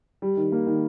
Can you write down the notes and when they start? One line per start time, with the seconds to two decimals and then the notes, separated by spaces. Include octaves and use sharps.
0.22 G3
0.37 D#3
0.52 A#3
0.67 D#3